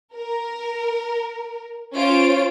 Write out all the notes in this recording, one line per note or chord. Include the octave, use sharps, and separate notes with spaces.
A#4
C#4 F4 C5 C#5 D7